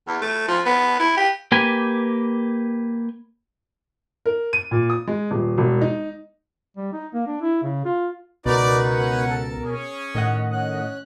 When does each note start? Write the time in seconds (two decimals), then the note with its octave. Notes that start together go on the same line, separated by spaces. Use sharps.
0.07 E2
0.21 A3
0.48 F3
0.65 B3
0.99 E4
1.17 G4
1.52 A#3 G4 B4 G#5
4.26 A#4
4.53 D#7
4.71 A#2
4.90 D#6
5.07 G#3
5.31 D#1
5.58 E1
5.81 D#4
6.77 G3
6.93 D#4
7.14 A#3
7.27 D4
7.42 E4
7.63 C#3
7.85 F4
8.46 C#2 B2 D#4 F#4 A#4 B4 D5
8.85 C#4 F#5
9.30 A4 A5
9.64 C#4 G#4
10.15 A2 D#3 D#5 F#5
10.52 C#4 F#6